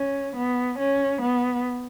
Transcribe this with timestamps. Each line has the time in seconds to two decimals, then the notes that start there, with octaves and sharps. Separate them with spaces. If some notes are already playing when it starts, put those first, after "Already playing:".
Already playing: C#4
0.37 B3
0.79 C#4
1.22 B3